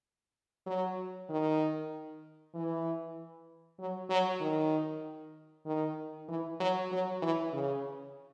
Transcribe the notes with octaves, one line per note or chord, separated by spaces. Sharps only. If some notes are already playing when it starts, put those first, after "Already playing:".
F#3
D#3
E3
F#3
F#3
D#3
D#3
E3
F#3
F#3
E3
C#3